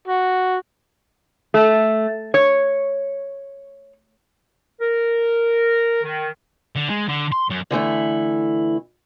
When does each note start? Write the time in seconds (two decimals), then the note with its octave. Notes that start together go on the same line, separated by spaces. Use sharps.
0.08 F#4
1.54 A3
2.34 C#5
4.80 A#4
6.03 D#3
6.76 D3
6.90 G#3
7.08 D3
7.32 C6
7.50 F#2
7.71 D3 E3 A3 E4